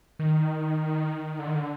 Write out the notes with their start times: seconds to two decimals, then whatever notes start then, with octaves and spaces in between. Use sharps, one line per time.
0.19 D#3
1.39 D3
1.47 D#3
1.55 D3